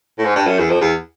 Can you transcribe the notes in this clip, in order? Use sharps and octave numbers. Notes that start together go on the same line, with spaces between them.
A2
G#2
G2
F#2
E2
F2
E2